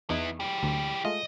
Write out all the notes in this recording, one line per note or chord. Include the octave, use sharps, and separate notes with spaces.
E2 B3 D#4 E4
E3 G4
D2
G#3 A3 F4 D#5